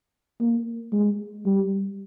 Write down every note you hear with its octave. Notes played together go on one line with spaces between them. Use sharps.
A#3
G#3
G3